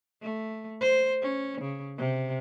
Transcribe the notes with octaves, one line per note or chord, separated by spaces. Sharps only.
A3
C5
C#4
C#3
C3